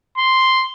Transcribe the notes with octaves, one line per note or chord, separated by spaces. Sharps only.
C6